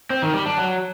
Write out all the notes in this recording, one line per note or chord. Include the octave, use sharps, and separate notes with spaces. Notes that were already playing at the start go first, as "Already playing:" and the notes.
C4
D#3
G3
D4
F#3